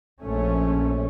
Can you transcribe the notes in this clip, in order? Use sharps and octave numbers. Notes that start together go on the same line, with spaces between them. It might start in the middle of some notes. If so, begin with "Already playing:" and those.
A#1 A3 C#4